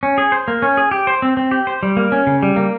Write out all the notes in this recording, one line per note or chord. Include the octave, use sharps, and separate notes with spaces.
C#4
G#4
C5
A#3
C#4
G#4
G4
C5
C4
C4
G4
C5
G3
A#3
C#4
C#3
G3
A#3